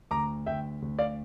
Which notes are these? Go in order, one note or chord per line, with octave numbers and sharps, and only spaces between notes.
D2 A#5 D6
D2 E5 G5
D2
D5 F5